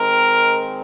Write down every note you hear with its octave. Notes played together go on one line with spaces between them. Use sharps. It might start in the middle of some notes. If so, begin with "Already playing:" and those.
Already playing: D#3 G#3 C4 A#4